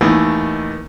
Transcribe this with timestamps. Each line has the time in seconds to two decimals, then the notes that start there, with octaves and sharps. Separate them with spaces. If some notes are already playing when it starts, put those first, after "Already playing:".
0.01 D#2 D#3 E3 A3